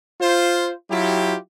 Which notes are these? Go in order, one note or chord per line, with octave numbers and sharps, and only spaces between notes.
F4 C5
F#3 E4 F4 G4